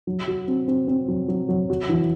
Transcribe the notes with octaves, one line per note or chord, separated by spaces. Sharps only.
F#3
F#4
C4
C4
C4
F#3
F#3
F#3
F#4
E3